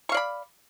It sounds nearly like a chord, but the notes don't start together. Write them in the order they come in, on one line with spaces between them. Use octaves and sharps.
C#6 F5 D5 B5